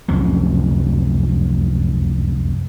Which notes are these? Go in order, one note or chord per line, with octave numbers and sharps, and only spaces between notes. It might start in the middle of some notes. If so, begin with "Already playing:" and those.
F1 C#2 F#2 F3